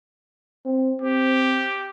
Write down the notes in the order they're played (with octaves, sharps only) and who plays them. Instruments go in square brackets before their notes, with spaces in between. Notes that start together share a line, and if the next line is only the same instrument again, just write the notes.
[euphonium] C4
[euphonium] C4 [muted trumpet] G4